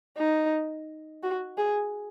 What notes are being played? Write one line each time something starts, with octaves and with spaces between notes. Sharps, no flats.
D#4
F#4
G#4